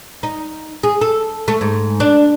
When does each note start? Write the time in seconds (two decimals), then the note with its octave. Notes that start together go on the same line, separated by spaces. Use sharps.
0.23 D#4
0.83 G#4
1.01 A4
1.48 A3
1.61 G#2
2.00 D4